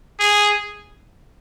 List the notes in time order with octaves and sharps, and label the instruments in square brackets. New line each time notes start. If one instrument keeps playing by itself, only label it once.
[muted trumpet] G#4